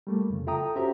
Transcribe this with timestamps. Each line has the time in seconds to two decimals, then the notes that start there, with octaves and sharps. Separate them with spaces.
0.07 G3 A3 A#3
0.30 F2 C#3
0.47 F4 A4 E5 G5 A#5 D#6
0.76 C#4 F#4 G4 C5 E5 A#5